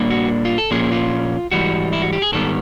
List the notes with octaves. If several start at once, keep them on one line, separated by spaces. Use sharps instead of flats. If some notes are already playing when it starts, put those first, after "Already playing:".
Already playing: A#2 G3 A#3 D4
F#4
F4
A4
A#2 F3 A#3 C#4 G#4
F4
G#2 E3 G3 F#4
E4
F#4
G4
G#4
G#2 D#3 G3 B3 A4